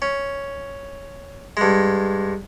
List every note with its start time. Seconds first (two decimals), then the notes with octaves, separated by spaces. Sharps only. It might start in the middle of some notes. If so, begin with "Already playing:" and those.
0.02 C#4
1.57 G2 G#3